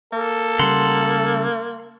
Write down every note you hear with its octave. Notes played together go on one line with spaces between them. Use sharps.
A#3 A4
C#3 G3 F#5 A#5 C6